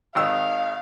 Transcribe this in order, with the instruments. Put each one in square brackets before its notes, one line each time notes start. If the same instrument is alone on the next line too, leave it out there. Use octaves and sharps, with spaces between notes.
[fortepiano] G#1 D#3 E6 [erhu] F5